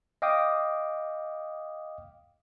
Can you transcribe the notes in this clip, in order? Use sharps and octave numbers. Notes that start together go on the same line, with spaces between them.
D#5 F5 G5 D6 D#6